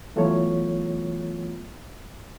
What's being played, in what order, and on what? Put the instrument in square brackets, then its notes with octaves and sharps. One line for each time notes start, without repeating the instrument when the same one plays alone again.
[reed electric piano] E3 F#3 A3 B3 F4 C#5